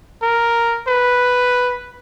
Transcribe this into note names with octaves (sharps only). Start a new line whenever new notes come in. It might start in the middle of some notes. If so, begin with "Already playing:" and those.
A#4
B4